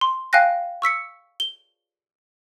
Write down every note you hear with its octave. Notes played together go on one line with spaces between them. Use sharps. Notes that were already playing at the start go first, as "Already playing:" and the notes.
C6
F5 G5 G#5 F#6 A#6
C#6 E6 B6 C#7
G7